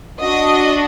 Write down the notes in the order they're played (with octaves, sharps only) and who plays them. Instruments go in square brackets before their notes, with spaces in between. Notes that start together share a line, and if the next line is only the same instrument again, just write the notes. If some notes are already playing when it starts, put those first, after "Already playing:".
[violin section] D4 F#4 D#5